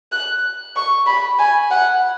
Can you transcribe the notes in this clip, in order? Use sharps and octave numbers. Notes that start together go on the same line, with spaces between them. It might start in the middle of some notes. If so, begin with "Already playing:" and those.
F#6
C#6
B5
G#5
F#5